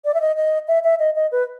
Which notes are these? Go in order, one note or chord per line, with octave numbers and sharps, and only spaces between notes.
D5
E5
D#5
D#5
E5
E5
D#5
D#5
B4